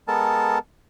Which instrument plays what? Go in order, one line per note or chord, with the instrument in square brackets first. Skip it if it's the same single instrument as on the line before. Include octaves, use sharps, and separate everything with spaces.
[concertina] G#3 B3 A4 A#4 A5